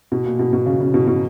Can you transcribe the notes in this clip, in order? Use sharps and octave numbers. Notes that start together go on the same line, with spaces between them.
B2
A#2
B2
B2
C#3
C#3
B2
B2